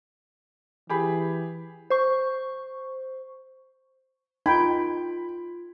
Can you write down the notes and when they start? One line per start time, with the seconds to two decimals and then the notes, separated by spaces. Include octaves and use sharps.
0.89 E3 G4 G#4 B5
1.90 C5 C#6
4.46 D#4 F4 G5 B5 C6 G#6